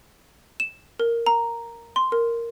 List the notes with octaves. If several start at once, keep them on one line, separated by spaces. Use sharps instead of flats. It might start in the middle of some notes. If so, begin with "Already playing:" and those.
E7
A#4
A#5
C6
A#4